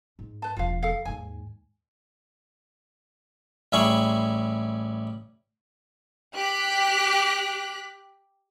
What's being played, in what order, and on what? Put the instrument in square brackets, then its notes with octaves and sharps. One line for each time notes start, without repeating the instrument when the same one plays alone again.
[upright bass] G#2
[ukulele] B4 A5
[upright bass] E1 F3 [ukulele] F4 F5
[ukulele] A4 F5
[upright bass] D#2 G#2 [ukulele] G#5
[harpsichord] A1 G3 E4 G#4 C#6
[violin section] G4 F#6 B6